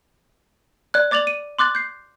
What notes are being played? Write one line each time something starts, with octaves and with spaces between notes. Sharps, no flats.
D5 F#6
D5 D6 A6 F7 F#7
D#7
C6 D6 F#6 A6 F#7
G6 C7